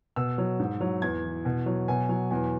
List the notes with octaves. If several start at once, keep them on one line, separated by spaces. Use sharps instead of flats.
B2 E6
F#3
G#2
F#3
E2 G#6
E3
B2
F#3
B2 G#5
F#3
E2 G#5